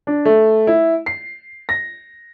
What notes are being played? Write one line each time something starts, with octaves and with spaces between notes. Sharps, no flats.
D4
A3
E4
C7
A#6